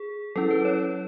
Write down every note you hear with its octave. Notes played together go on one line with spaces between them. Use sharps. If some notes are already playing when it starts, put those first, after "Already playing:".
Already playing: G#4
F#3 C#4 E4 A4
B4
C#5